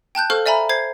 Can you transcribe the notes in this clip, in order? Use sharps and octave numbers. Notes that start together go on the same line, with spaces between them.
G5 A5 F#6 G6
A4 C5 F5 C#6 F6
D5 E5 G#5 A#5 B5
C5 G#6 C7